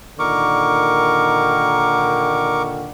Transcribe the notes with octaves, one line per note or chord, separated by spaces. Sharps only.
A#2 D3 D#3 A#4 C#6 D6